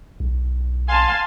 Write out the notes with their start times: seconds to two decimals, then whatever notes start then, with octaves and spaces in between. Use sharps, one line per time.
0.20 B1
0.88 F5 G#5 A5 C6